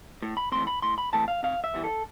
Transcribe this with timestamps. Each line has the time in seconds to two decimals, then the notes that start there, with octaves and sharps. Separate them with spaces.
0.22 A2
0.37 B5
0.52 E3 A3 C4 C6
0.67 B5
0.82 A2 C6
0.98 B5
1.13 E3 A3 C4 A5
1.28 F5
1.43 C3 F5
1.64 E5
1.74 E3 G3 B3
1.84 A4